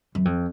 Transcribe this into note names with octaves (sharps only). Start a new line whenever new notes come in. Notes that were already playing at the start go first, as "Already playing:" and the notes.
F#2
F2